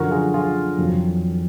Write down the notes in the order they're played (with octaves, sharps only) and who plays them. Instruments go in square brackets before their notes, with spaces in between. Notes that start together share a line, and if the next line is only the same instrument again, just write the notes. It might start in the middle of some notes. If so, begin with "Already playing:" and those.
Already playing: [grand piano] F#2 D3 F3 F#4 A#4
F4 G#4
F4 G#4
F2 D#3 F#3